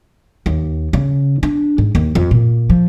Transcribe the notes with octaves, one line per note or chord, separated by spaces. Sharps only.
D#2
C#3
D4
G#2
D#2
F2
A#2
F3